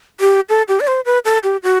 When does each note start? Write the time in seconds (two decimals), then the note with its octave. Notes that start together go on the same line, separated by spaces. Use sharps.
0.20 G4
0.49 A4
0.68 G4
0.80 D5
0.87 C5
1.06 B4
1.25 A4
1.43 G4
1.63 F#4